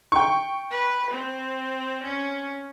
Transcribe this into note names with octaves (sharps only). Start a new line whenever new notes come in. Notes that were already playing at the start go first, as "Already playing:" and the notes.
G5 C#6
B4
C4
C#4